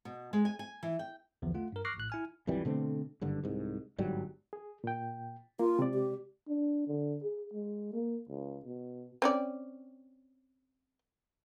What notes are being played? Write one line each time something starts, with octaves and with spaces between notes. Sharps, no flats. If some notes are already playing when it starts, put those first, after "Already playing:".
B2
G#3
G#5
G#5
E3
G5
B1 E2 D3 F3
A3 F4 F#5
G2 A#4
C#6 D6 F6 F#6 A#6 C7
A#1 A2 F#6
E4 G#5 F6
B1 F2 E3 G3
B2 D3 A3 C4
F#1 G2 D3
C2 G#2
G1 G#2 F#3 G3
G#4
A#2 G5
A#3 F4
C3 G#3 D5
G4
D4
D3
G#4
G#3
A#3
C#2
B2
C4 C#4 D5